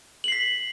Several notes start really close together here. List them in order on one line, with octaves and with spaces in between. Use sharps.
F#7 C7 B6